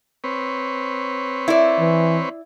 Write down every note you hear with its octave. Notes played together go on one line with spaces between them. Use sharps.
C4 B4 C#5
E4 D5
E3